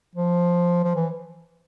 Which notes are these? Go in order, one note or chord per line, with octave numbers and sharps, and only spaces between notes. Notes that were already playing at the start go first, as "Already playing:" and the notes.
F3
F3
E3